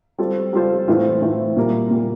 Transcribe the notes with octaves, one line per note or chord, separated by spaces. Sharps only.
G3 C4 F4 A4 C5
G3 C4 F4 A4 C5
A2 E3 A3 C4 F4
A2 E3 A3 C4 F4
A#2 G3 A#3
A#2 G3 A#3